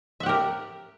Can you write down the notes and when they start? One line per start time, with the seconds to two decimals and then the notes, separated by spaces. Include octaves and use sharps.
0.20 E5
0.23 F#5
0.26 G4
0.29 A#4